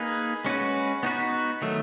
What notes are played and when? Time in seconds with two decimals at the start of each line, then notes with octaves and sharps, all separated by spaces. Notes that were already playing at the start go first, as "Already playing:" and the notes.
Already playing: A#3 D#4 G#4 B4
0.45 G#3 C#4 F#4 B4
1.03 B3 D#4 F#4 B4
1.62 D#3 F#3 A3